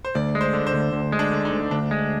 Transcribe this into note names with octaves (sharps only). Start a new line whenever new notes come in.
C5
D2 D5
G#3
C5
D3
C5
D2
D2
G#3
D4
D3
D#4
D2
D2 D4
G#3